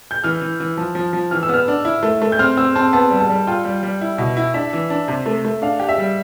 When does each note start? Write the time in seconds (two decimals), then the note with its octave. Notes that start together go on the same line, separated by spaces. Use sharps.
0.11 G6
0.24 E3 F6
0.41 E3
0.60 E3
0.77 F3
0.95 F3
1.13 F3
1.31 E3 F6
1.43 E6
1.49 B3 F6
1.68 D4
1.85 E4
2.03 A3
2.22 A3
2.32 G6
2.39 C4 F6
2.57 C4 E6
2.75 C4 A5
2.93 B3 A5
3.10 G3
3.20 A5
3.29 G3
3.47 F4 G5
3.65 G3
3.83 G3
4.01 E4
4.18 B2
4.37 E4
4.54 D4 E5
4.73 E3
4.90 D4
5.08 C3
5.26 A3
5.45 A3
5.62 D4 F5
5.80 G4
5.89 E5
5.98 G3